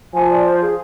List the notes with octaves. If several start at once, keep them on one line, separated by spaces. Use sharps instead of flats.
F3 G#5
D5
C5
G#4